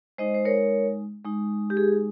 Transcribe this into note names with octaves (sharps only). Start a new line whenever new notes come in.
G#3 D#4 C5 D#5
C5
A#4 C#5
G#3 D#4
G4
G#4